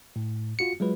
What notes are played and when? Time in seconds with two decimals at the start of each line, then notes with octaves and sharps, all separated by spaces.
0.16 A2
0.59 F4 F#4 C#7
0.80 F#3 G#3 F4 B4